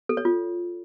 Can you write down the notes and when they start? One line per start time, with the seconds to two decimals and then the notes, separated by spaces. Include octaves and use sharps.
0.09 A4
0.17 C#5
0.25 F4